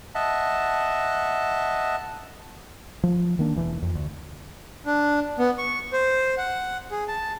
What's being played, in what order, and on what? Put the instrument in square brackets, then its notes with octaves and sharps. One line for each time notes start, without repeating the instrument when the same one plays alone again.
[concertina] D#5 E5 F#5 A5
[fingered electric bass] F3
D#3 A#3 D4
E1 E3
F2
D2
[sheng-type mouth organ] D4
B3
C#6
C5
F#5
G#4
A5